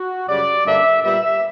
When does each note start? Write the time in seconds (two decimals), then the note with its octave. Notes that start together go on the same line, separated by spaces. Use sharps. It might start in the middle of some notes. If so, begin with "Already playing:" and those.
Already playing: F#4
0.28 F#2 C#3 G3 D5
0.65 G2 D3 A#3 D4 E5
1.03 A#2 G3 B3 E5